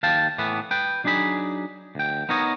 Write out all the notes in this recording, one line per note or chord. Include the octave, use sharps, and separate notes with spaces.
D#2 F5 G5 A5
A2 E3 B3
B4 G5
F#3 D4 D#4 G#4 B5
D2 G5
B3 D#4 A#4 C#5 D#5